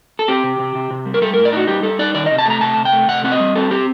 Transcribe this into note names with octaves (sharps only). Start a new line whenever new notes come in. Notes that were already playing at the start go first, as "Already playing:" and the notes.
A4
C4 G4
C3
C3
C3
C3
G3
A#4
G3 A4
A2 A#4
D5
D#4 F#4
G3 G4
G3 A4
D#4 D5
D#3 D5
C3 D#5
A5
A3 A#5
C3 A5
C3
G5
A3
C3 F#5
C4 F#5
D#5
G3
C4 A4
C4 G4